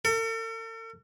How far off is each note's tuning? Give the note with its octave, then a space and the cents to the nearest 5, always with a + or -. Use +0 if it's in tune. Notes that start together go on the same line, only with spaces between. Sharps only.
A4 +45